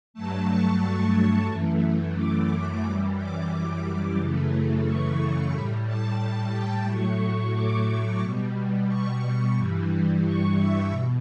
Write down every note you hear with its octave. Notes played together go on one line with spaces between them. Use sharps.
G2 F#3 A3 A5
C#6
F#2 E3 A3
D6
F#2 E3 G3 D6
D6
F#2 C#3 E3 A3
C#6
A2 G3 B5
A5
A5
G5
A2 F#3 A3 C#6
D6
B2 G3
C#6
G2 E3 G3
C#6
E5
B2